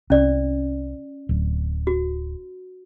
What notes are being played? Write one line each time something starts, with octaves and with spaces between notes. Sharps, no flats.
C2 C#4 D5
D1
F#4